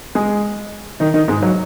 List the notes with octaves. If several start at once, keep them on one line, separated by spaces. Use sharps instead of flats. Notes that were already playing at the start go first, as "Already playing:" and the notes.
G#3 G#4
D#3 D#4
D#3 D#4
G#2 G#3
F#3